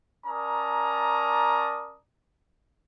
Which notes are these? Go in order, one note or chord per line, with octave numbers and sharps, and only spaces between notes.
C#4 A#4 D5 A5 A#5 D#6